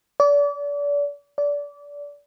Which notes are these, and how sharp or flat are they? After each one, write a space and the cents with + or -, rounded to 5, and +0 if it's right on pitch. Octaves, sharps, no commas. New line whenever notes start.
D5 -35
D5 -25